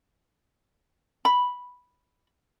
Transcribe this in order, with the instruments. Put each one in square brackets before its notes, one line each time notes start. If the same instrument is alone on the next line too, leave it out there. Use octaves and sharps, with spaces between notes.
[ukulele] B5